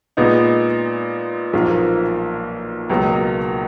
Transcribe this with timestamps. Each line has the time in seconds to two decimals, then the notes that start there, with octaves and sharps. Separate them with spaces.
0.17 A#2 G#3 B3 D#4
1.53 B1 A#2 F3 A#3
2.90 C#2 B2 F#3 A#3